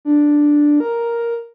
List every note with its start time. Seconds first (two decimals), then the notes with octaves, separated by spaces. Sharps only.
0.05 D4
0.80 A#4